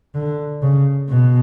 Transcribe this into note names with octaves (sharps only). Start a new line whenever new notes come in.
D3
C#3
B2